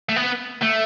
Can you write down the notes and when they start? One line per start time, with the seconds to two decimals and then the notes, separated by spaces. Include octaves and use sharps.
0.09 A3
0.16 B3
0.63 A3